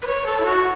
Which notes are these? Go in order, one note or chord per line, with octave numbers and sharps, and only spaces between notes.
B4
C#5
A4
E4
F#4